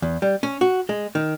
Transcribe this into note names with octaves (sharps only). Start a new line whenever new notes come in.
E2
G3
C#4
F#4
G#3
D#3